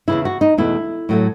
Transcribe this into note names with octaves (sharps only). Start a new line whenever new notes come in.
E2 C#3 E3 E4
F#4
D#4
E2 B2 A3 E4
A2 F#3 A3